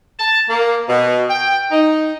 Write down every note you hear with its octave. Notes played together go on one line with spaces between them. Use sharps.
A5
A#3
B2
G5
D#4